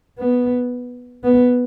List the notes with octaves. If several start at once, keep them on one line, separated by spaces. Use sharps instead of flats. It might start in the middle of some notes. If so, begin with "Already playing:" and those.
B3
B3